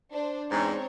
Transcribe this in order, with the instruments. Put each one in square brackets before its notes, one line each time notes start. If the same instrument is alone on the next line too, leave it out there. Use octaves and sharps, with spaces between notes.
[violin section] D4 C5
[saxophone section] E2 G#2 [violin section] C4 D4 C#5